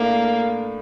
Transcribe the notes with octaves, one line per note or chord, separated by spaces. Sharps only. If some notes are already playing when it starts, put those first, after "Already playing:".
Already playing: A2 A3 A#3 D4